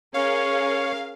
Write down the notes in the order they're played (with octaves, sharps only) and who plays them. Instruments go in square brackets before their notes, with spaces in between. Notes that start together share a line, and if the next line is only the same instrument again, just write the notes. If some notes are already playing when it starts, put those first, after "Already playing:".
[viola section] C#4 G#4 A#4 [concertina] C#5 [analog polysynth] F5